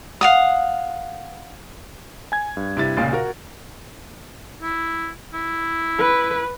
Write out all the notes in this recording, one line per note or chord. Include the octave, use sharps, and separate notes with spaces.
F5 F#5 D#6
G#5 G#6
G2
C3 E4 A6
C#2 A#2 C#3 A6
F#4 A#4
E4
E4
B4